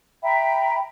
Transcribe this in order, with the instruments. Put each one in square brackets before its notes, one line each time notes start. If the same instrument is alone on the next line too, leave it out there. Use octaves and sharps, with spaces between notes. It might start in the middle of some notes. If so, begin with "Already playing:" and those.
[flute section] E5 G5 A#5 B5